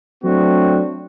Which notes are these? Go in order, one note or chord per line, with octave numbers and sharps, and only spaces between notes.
F#3 A3 C4 D4 F#4